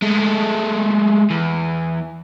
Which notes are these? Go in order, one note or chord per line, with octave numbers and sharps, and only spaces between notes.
G#3 A3
E2